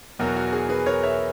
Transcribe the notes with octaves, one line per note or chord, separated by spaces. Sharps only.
E2 B2 F#3 F#4 A#4
F#4
G#4
G#4 B4
A#4 C#5
C#5 E5